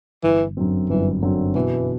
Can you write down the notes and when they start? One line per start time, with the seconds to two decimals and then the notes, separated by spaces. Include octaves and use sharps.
0.23 G1 E3
0.57 F#2 D3 F#3 C4
0.90 G1 E3
1.22 F#2 D3 F#3 C4
1.55 B2 E3